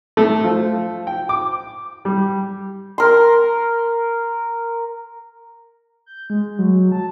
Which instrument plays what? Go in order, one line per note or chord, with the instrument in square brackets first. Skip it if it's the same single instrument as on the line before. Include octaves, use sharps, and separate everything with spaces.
[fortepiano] A3
F3
G5
D6
G3
[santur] A#4 C6
[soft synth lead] G6
G#3
F#3
A5